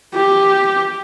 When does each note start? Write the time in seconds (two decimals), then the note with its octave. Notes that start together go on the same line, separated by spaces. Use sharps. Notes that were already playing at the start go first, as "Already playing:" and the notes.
0.15 G4